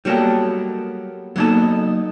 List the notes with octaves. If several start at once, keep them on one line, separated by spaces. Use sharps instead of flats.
F#3 G3 A#3 B3 G4 A4
F#3 A#3 B3 D#4 A4 A5